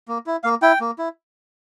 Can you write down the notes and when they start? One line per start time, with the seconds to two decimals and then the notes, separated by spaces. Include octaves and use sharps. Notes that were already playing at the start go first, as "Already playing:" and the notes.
0.08 A#3
0.26 E4
0.44 A#3 F5
0.62 E4 G5
0.81 A#3
0.99 E4